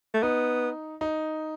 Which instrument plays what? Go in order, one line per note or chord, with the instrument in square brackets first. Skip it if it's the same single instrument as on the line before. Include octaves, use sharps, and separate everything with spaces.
[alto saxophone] A3
[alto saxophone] B3 [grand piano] D#4
[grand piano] D#4